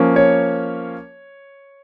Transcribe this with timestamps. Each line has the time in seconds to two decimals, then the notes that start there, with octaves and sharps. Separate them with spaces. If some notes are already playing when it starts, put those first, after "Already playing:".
Already playing: F3 A#3 C#4
0.16 C#5